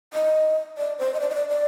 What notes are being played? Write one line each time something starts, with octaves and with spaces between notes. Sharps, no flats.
D#5
D5
C5
D#5
D5
D#5
D5
D5